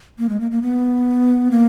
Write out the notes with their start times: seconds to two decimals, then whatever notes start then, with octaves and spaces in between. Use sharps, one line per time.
0.19 A#3
0.29 G#3
0.40 A#3
0.51 A#3
0.62 B3
1.51 A#3